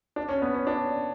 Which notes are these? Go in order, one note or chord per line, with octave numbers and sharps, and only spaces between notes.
D4
C#4
B3
C#4
D4